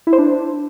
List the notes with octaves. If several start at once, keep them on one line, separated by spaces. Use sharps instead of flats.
E4
C5
D4